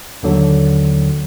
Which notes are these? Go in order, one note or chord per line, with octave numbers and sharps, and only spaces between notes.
D#2 D3 F#3